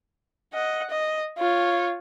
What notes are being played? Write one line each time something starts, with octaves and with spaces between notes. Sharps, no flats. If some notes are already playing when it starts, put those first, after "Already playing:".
D#5 F#5
D#5
F4 C#5